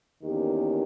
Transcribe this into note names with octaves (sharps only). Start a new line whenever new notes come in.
E2 D#3 A#3 C#4 G4